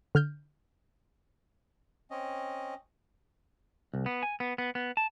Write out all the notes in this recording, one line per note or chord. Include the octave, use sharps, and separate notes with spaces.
D3 F6 G6
C4 C#4 D#5
C2
B3
G#5
B3
B3
B3
A5